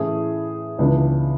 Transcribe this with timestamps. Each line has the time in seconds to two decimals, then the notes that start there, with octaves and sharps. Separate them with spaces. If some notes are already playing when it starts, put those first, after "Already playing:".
Already playing: A2 E3 A3 C#4 G#4
0.79 C#2 C#3 E3 B3 D4